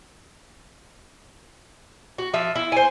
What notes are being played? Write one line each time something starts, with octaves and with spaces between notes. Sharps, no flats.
F#4
F3 E5
E4
C5 G#5